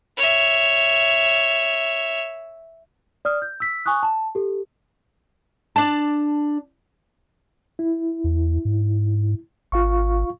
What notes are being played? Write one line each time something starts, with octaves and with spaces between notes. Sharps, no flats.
C#5 E5
D5 D#6 F6
G6
E6 B6
G#5 C#6 D#6 F#6
A5
G4 A4
D4 A5
E4
E2
G#2
G#1 F4 F5 C#6